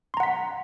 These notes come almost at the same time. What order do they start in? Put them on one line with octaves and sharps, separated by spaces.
C6 A#5 F#5 B6